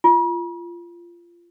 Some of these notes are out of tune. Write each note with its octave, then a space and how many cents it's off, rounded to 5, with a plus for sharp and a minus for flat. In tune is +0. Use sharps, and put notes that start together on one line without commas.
F4 -20